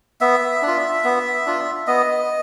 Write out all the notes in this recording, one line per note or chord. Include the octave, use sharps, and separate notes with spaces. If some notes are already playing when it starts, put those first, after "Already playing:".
B3 E5
D4
F4
B3
D4 F4
B3 D#5